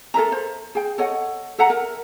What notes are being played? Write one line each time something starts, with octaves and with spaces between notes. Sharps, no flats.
A4 A#4 E5 A#5
C5
G#4 G5
A4 C#5 D#5 F#5
A4 E5 F#5 A#5
A#4